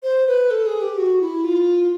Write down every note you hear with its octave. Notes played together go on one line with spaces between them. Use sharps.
C5
B4
A4
G#4
G4
F#4
E4
F4